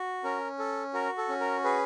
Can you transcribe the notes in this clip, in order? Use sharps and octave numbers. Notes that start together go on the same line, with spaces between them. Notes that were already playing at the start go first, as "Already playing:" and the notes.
Already playing: F#4
C#4 A#4
A4
F#4 A#4
A4
C#4
A#4
G#4 B4